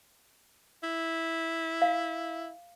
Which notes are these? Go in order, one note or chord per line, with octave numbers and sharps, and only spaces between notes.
E4
F5